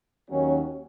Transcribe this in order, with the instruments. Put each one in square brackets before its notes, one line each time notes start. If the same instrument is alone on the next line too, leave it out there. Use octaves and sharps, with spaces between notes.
[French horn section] D#2 D#3 F#3 C#4